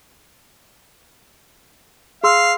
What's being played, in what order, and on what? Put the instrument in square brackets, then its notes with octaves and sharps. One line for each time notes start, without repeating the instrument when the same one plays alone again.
[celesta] G#4 C6 E6 [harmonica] F5